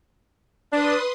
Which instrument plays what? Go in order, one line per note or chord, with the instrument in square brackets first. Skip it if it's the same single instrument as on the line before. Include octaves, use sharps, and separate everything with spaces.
[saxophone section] D4 [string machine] B4 C6 D#6